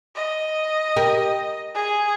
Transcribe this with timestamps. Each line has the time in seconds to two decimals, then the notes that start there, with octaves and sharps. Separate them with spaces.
0.15 D#5
0.96 G4 A#4
1.74 G#4